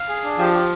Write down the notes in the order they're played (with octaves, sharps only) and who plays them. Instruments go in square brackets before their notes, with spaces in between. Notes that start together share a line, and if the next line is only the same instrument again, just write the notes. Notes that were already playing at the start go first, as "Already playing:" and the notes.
Already playing: [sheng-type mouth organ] F5
G#4
D4
[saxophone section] F3 [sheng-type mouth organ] G4
[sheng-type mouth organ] G4